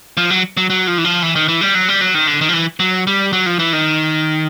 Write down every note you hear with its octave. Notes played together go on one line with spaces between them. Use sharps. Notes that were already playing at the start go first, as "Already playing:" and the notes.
F3
F#3
F#3
F#3
F3
E3
F3
E3
D#3
E3
G3
F#3
G3
F#3
D#3
D3
D#3
F3
E3
F#3
G3
F#3
F3
E3
D#3